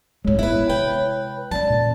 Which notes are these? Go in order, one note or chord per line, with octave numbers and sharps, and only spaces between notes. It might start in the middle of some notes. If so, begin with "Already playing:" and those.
G#1 A2 G#3 C#5
B3 E4 B4
C3 B4 G5
E3 C#4 D5 A5
A#2